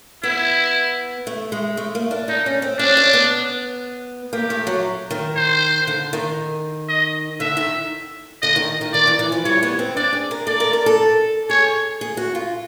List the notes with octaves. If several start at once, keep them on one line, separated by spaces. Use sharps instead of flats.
B3 E4
A3
G#3
A3
A#3
D4
D4 D#4
C#4
C4
C#4 D4
C#4
B3
A#3 G4
A3
F#3
D#3
C5
D3
D#3
D#5
D3 E5
D#3
D3 D#5
D#3
D#3
D#3 D5
E3
E3
F3
G3 C#5
B3
C4
D4 D5
G#4
A#4
A4 D5
A#4
A#4
A4
G#4 C#5
G#4
F#4
F4